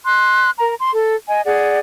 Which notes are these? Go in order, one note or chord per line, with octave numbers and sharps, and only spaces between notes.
C6 F#6
A#4 A#5
C6
A4
D#5 G#5
G#4 D5 F#5